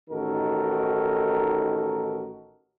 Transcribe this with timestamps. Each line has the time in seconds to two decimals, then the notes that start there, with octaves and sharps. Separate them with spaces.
0.10 A1 D#3 D#4 F#4 A4 A#4